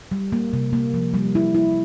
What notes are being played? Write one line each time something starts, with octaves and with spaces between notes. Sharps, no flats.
G3
A#3
C3
A#3
F3
G3
E4
E4